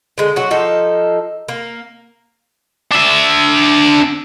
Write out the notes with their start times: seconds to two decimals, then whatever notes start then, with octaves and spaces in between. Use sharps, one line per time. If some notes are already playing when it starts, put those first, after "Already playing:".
0.18 D3 G#3
0.36 F#3 F#4
0.51 F3 D#4 A4
1.48 A#3
2.91 D4 E5